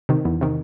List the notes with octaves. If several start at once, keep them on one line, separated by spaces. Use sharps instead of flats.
C3 D#3
E2
C3 D#3